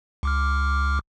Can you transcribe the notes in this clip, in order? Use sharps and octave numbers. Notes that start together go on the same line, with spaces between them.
C#2 D6 F6